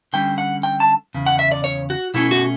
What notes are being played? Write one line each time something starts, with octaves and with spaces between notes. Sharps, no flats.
D3 G3 C#4 G5
F#5
G5
A5
E2 C#3
F#5
E5
D5
C#5
F#4
B2 A3 C#4 E4
F#4